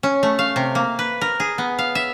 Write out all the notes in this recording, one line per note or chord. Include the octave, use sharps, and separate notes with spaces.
C#4
A3
F5
C3
A#3
B4
A#4
G#4
B3
F5
E5